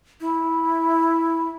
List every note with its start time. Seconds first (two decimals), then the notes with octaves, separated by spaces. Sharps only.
0.20 E4